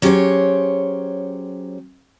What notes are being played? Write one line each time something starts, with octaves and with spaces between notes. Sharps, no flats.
F#3 C#4 G4 G#4 C5 C#5